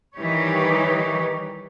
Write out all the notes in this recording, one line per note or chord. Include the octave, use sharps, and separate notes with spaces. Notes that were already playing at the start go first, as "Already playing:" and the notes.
D#3 E3 G3 D#4 G4 C#5